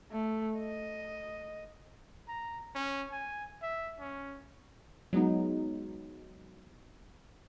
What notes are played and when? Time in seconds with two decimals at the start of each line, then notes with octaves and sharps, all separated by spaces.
0.11 A3
0.59 D#5
2.28 A#5
2.75 C#4
3.12 G#5
3.62 E5
4.00 C#4
5.13 F#3 G#3 B3 D#4